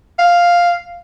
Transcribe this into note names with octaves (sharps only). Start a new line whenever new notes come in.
F5